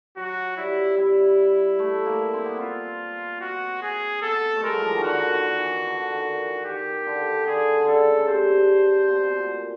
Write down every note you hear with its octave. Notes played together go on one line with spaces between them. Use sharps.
F#3 F#4
G3 E4
G3 E4
A3
A#3
C4
B3
C4 F4
C4 F#4
G#4
B3 A4
A3
G#3 A#4
F#3
F3
E3
D#3
D3 F#4
D#3
E3
D3
D#3
E3
D#3 G4
D3
D3 G#4
D3
C#3 A4
C#3
C3 C5
B2
B2
A#2